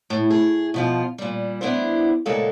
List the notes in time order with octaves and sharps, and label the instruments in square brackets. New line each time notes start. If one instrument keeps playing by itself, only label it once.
[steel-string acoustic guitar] A2
G#4
B2 F3 F4
A#2 G3
B3 D4 E4 C5
A#2 C#3 G#3 F#4 A4 F5